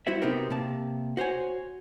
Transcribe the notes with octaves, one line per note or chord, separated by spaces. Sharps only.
G3 E4 F#4 C5 E5
C3 B3 C4 D#4 G4 A#4
C3 A#3 A5
F#4 C5 C#5 G#5